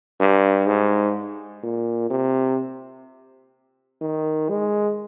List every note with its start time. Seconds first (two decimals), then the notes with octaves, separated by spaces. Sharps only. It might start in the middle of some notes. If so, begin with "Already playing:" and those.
0.20 G2
0.66 G#2
1.63 A#2
2.10 C3
4.01 D#3
4.49 G#3